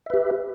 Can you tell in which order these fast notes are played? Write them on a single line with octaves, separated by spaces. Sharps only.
E5 B4 G4